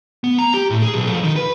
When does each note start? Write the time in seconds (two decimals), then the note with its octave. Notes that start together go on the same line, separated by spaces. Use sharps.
0.24 B3
0.39 A#5
0.54 G4
0.70 A2
0.82 G#4
0.94 B1
1.08 F2
1.24 D#3
1.36 B4